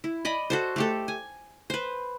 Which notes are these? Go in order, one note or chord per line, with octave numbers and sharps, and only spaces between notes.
E4
D5 D#5 B5
F#4 A4 C5
A3 G4 A4
G#5
B4 C5